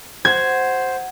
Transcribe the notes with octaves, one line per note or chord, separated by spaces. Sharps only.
F#4 C5 G#6